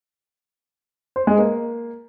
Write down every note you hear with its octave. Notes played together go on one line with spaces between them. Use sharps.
C5
G#3
A#3